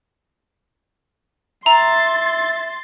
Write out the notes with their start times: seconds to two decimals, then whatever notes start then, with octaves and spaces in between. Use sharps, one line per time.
1.66 E5 A#5 C6 A6